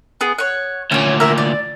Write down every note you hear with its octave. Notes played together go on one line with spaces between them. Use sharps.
B3 G#4
C#5 F#5
D2 A#2 C#4 C#5
A#4 E5
D5